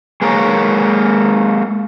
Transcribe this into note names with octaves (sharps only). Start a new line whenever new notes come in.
G#3 A#3 A#4 C#5